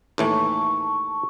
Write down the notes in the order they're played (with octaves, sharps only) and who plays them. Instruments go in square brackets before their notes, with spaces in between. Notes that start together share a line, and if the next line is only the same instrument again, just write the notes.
[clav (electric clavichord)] D#2 A2 E3 [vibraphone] A5 C#6